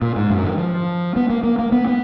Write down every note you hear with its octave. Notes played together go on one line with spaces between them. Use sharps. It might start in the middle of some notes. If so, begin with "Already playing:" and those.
A#2
G#2
F#2
D#3
F3
B3
A#3
A#3
A#3
B3
B3